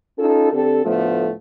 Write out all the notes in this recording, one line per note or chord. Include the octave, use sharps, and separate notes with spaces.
C#4 D#4 F4 A4
D3 C4 G4 A4
D2 A2 F3 A3 B3